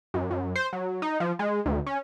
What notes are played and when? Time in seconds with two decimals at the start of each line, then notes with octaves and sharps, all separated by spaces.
0.14 F#2
0.31 F#2
0.56 C5
0.73 F#3
1.02 D#4
1.20 F3
1.39 G#3
1.66 D2
1.86 C#4